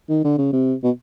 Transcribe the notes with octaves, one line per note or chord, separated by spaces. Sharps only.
D#3
D3
C#3
C3
B2